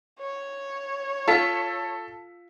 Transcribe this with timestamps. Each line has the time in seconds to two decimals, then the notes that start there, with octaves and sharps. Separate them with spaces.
0.20 C#5
1.28 F4 A4 A5 B6